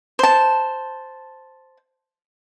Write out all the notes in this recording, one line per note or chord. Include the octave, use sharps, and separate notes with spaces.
C5 A5